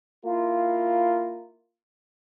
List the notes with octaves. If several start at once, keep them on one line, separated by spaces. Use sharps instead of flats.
A#3 E4 F4